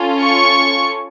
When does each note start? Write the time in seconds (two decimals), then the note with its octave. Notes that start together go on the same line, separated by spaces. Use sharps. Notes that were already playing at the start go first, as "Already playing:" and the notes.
Already playing: C#4 F4 A4
0.23 C#6